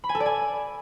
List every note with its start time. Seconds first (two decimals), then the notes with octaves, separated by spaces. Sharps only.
0.04 B5
0.09 G#5
0.15 A4
0.20 D5
0.26 G#5